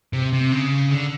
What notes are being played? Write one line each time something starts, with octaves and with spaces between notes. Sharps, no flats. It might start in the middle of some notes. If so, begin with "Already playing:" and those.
C3
C3
C#3
D3